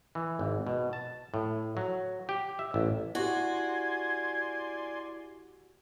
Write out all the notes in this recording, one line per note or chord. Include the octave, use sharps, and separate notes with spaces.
E3
G#1
B2
A5
A2
F#3
G4
E5
A1
E4 F#4 G4 D5 G#5 C6 G#6